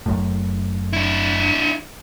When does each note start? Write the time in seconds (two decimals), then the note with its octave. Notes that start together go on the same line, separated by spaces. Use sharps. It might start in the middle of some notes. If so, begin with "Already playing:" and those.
0.06 F#1 F#2 A2
0.93 D4 E4